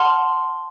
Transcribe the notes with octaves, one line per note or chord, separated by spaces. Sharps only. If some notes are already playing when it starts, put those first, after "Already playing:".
Already playing: F#5 A5 C6 F6